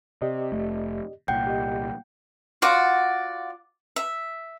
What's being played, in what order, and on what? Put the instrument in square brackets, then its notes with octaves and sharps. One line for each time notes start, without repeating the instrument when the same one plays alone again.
[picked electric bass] C3 [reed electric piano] G4 D5 D#5
[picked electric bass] F1 A3
[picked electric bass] C2 A#2 [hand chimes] F#5 G5 G6
[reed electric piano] G4 D#5
[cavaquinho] F4 F#4 D5 F#5
E5